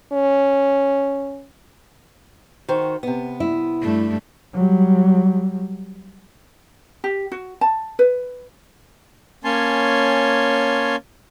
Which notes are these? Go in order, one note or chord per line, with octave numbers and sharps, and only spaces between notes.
C#4
D#3 F#4 C5
C3 B3
E4
G2 A3
F#3 G3
G4
F#4
A5
B4
A#3 C#4 C#5 G#5 A5 C6